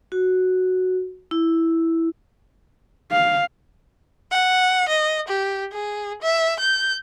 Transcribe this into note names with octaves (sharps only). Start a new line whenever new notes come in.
F#4
E4
F5
F#5
D#5
G4
G#4
E5
G6